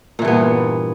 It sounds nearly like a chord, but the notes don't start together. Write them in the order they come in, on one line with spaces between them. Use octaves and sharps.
A#2 E3 G2 B3